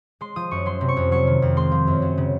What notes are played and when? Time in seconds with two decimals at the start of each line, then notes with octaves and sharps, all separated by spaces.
0.21 G#3 C6
0.36 F3 D#6
0.51 F#2 C#6
0.66 F#3 C6
0.81 C3
0.88 C#6
0.97 F2
1.12 F#3 C#6
1.27 D#3
1.42 F2
1.57 G#3 C6
1.72 F3
1.87 F#2
2.02 F#3
2.18 C#3